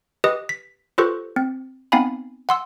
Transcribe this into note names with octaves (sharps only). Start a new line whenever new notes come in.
G4 B4 D#5 D#6
B6
F4 G4 A4 B4 C5 C#6
C4
B3 C4 D#4 F5 G#5 B5
F#5 C6 E6